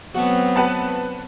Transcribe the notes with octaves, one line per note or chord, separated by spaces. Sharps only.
F#3 A3 B3 C4 F#4
B4 F#5 A5